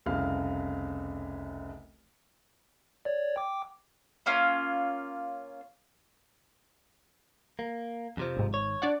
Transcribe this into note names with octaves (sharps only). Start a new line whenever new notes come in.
F1 C2 C#3 F5 F6
C#5 D5
G5 D6
A#3 C#4 F4
A#3
F2 C3 F3
G#1 G#2
C#5
D4 D5 F#5